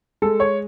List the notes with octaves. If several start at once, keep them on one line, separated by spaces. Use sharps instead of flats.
G#3 A4
C#5